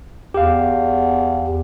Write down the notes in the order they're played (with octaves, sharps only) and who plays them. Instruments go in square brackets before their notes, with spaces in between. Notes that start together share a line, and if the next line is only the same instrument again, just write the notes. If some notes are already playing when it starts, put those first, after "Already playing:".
[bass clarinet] E2 [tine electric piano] G4 F5